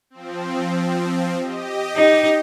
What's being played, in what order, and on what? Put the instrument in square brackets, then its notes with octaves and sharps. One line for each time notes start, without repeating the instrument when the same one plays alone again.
[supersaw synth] F3 C4
G4 D#5
[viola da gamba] D#4